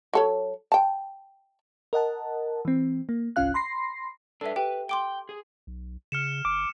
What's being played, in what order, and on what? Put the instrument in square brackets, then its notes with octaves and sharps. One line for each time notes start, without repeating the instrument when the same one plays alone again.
[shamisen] F#3 A4 C#5
G5 A5
[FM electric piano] A#4 D#5 F#5 A5
E3 C4
A#3
G1 C2 C#4 F4 F5 F#6
B5 C6 A#6 C7
[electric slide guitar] D4 B4 [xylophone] A4 E5
[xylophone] G4 G5 [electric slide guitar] B4
[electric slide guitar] G5 [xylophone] C6 D6 D7
[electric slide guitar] G#4
[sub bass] B1
[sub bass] C#3 [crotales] F6 C#7 E7
[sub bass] G1 [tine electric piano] D6